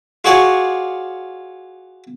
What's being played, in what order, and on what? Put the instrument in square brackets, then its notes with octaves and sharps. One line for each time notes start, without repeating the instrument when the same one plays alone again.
[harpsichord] F4 F#4 G#4 C#5 D5 G#5